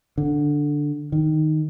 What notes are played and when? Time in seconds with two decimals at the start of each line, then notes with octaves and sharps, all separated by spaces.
0.18 D3
1.12 D#3